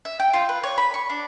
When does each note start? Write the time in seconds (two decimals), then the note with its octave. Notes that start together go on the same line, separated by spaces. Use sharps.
0.05 E5
0.20 G5
0.33 F4
0.49 B4
0.63 C#5
0.78 B5
0.94 C#6
1.10 D4